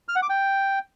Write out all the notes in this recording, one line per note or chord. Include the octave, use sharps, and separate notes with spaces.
F6
F#5
D6
G5